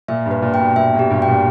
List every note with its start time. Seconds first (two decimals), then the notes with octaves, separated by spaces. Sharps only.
0.08 A#2 E5
0.26 G2
0.31 B4
0.42 A#2
0.54 G5
0.59 B2
0.76 A#2 E5
0.94 B2
0.99 G4
1.10 G2
1.22 G5
1.27 A#2